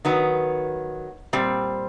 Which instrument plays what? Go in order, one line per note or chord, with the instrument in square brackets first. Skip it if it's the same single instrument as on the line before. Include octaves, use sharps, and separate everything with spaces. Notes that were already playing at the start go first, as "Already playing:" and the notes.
[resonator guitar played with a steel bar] D#3 F#3 B3
A#2 G3 C4